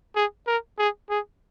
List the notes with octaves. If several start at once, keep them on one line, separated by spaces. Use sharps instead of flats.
G#4
A#4
G#4
G#4